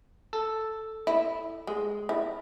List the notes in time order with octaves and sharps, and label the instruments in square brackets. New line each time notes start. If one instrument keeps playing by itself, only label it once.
[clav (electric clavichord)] A4
[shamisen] E4
G#3
E4